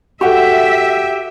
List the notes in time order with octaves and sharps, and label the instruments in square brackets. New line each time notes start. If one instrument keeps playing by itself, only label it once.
[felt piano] F#4 A4 [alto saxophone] G4 [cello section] E5 [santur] F#5 C#6